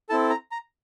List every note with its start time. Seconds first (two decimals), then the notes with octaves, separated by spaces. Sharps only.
0.09 C4 E4 A4 A5
0.30 A#5
0.52 A#5